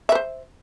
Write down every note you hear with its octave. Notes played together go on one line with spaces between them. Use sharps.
B4 C5 E5